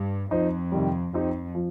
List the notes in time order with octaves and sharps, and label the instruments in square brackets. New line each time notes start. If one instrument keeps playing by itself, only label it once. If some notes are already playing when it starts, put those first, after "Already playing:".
Already playing: [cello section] G2
[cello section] F2 [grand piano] F3 D#4 C5
[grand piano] C3 D#3 G3
[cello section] F2 [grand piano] F3 C4 D#4 G4
[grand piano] F3